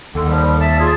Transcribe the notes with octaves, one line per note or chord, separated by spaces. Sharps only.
D#2 D3
F3 G3
E5 A5
F4 G#4